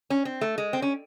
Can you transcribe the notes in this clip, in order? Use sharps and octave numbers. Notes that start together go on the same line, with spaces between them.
C#4
C4
A3
G#3
C4
C#4